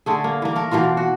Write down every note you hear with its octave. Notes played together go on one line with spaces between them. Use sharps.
D3 A3 G#4
A#3
E3 A#3
A3 A#4
B2 E3 A#3 F4
F#4